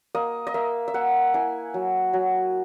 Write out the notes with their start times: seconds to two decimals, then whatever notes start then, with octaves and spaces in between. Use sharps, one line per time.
0.15 A#3 D#5
0.47 D#5
0.54 A#3 E5
0.88 E5
0.94 A#3 F#5
1.34 E4 G#5
1.74 F#3
2.13 F#3